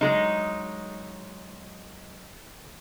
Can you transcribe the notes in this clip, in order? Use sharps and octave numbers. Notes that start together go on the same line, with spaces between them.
F#3 G#3 D#4